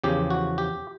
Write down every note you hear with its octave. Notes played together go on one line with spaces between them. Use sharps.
E2 C#3 F3 G4
F#4
G4